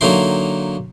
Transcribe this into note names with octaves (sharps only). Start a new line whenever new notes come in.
D3 F#3 A#3 D#4 E4 C6